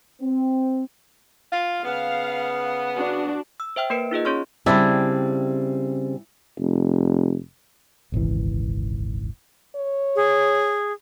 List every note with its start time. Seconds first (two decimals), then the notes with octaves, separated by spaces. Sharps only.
0.20 C4
1.52 F4
1.85 C#3 B3 F5
2.97 D4 F#4
3.60 E6
3.76 C5 E5 G5 F6
3.90 A#3 A#4 B4 C#7 D7
4.11 D#4 F4 G#4 D#5
4.25 C#4 G#4 C#5 C6 C#6 F6
4.66 C#3 G3 C4 D4 E4
6.59 F1
8.12 D#1 G#1 C#2 E3
9.76 C#5
10.16 G#4